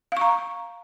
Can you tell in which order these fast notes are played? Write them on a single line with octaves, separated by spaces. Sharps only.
F5 C#6 A#5